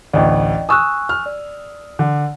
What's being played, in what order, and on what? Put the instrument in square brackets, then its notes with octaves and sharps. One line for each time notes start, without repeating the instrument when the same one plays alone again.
[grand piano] A1 D2 [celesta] D5 D#5 G5
[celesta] G#5 C#6 F#6 [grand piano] D#6 E6
[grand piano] F6
[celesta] D5
[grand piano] D3